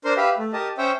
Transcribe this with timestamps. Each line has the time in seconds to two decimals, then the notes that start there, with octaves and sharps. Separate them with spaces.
0.05 D4 A#4 C5 C6
0.17 G4 B4 E5 F5
0.38 A3
0.53 G4 A#4 D#5 A5
0.78 C#4 C5 C#5 E5 G5